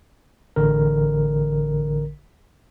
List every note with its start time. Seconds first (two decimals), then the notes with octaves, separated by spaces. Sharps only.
0.56 A1 D3 A#4